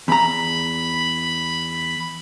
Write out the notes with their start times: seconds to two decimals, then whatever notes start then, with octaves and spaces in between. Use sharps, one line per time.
0.08 E2 A#5 B5